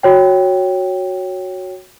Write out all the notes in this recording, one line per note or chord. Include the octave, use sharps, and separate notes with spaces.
F#4 C#5 G5